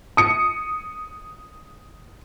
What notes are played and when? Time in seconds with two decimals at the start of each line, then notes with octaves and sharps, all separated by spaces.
0.17 D#6 C#7